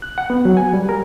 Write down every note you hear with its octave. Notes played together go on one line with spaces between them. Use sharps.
F#6
F#5
B3
F#3
G#5
G3
A#4